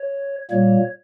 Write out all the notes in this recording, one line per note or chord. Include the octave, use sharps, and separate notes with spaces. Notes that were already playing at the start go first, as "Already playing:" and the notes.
Already playing: C#5
A#2 G3 A#3 C#5